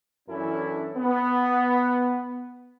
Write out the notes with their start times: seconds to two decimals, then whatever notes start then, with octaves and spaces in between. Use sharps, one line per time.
0.29 F#2 E3 C#4 D4 E4 A4
0.97 B3